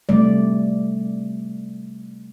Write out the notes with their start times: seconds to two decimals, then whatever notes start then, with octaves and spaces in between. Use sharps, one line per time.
0.09 C3 G3 A3 D5